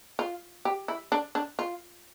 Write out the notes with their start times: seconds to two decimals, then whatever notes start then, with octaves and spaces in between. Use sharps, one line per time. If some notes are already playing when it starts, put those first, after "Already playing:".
0.19 F4
0.65 G4
0.88 E4
1.12 D4
1.35 D4
1.59 F4